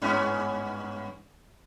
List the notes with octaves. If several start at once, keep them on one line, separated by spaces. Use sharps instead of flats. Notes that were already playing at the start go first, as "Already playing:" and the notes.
G2 B3 C#4